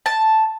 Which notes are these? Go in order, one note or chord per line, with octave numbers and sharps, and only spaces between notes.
A5